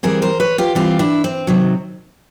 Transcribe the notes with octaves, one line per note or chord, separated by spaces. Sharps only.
E3 G3 C4 G#4 A#4
A#4 C5
B4 C#5
F4 G4
E3 G3 C4 F4 G4
D4 E4
C4
C3 D#3 F#3